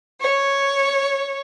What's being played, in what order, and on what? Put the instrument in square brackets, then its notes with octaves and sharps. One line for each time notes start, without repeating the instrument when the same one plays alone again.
[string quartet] C#5